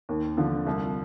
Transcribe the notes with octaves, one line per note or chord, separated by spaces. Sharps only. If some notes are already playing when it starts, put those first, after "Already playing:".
D#2
D3 F3
C2